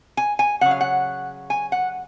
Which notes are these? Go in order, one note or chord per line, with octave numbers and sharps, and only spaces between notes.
G#5
G#5
C#3 F#3 F#5
F5
F#5
G#5
F#5